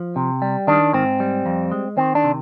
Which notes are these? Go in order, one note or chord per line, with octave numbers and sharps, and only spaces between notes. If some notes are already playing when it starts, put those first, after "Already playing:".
Already playing: F3
C3
G3
D#3 D4
G#2 C4
G3
F2
G#3
D#3 C4
D4
C3